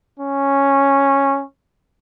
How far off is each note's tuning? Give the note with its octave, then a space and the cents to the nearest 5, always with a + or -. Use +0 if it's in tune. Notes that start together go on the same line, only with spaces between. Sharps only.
C#4 -5